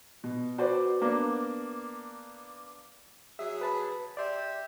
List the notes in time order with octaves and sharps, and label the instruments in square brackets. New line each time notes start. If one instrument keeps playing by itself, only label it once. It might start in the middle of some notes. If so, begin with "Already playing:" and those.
[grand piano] B2
F#4 B4 C5 D5
A#3 B3 D4
[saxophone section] F#3 G#4 [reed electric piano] E5
[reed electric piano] B4 A5 B5
[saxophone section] G4 E5 [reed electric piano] D5 C6